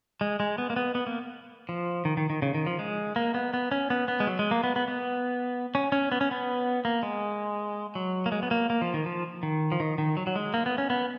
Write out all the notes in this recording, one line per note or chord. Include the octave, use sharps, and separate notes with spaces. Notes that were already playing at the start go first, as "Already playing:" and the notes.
G#3
G#3
B3
A#3
B3
B3
A#3
F3
D#3
D#3
D#3
C#3
D#3
F3
G#3
A#3
B3
B3
C#4
B3
B3
G#3
F#3
G#3
A#3
B3
B3
B3
C#4
C#4
B3
C#4
B3
A#3
G#3
F#3
A#3
G#3
B3
A#3
A#3
F3
D#3
F3
D#3
F3
D#3
D#3
F#3
F#3
G#3
A#3
B3
C#4
B3